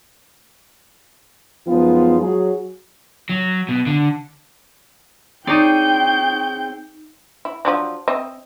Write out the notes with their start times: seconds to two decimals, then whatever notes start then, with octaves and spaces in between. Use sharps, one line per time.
1.67 F#2 F3 G#3 B3 D#4 F4
2.20 F#3 F#4 G#4
3.29 F#3
3.69 B2
3.86 D3
5.47 C4 D#4 G#4 C#5 D5 G5 G6
7.45 E4
7.65 F3 F#3 D4
8.08 C4 D#5 E5